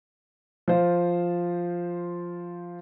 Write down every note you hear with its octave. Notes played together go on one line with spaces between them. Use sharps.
F3 F4 C5